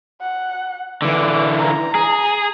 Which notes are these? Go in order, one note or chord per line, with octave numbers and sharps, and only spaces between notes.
F#5
D3 E3 D6
A#5
G#4